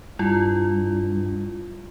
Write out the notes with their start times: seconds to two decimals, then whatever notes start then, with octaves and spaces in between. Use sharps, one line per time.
0.19 G2 E4 F4